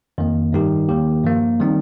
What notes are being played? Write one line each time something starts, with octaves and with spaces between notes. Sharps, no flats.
F2 D#3 A#3
G2 D#3 G3 D#4 G4
D#2 D#3 A#3 G4
G2 F3 A#3
D#3 G3 C4 D#4